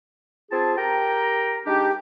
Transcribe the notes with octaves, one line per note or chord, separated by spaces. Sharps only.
C4 F4 G#4 A5
G4 A#4 G5 A#5
G#3 D4 D#4 G4